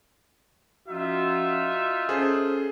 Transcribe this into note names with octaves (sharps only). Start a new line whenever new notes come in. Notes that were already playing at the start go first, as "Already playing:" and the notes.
F3 C#4 D#4 F4 F#4 E5
C#4 G#4 A4 C5